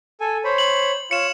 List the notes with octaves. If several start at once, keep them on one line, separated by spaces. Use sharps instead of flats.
A4 G#5
C5 C#5 B5
F#7
F4 C#5 C#7 E7